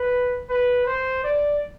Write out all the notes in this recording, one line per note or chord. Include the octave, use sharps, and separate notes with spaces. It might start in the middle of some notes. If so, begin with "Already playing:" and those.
Already playing: B4
B4
C5
D5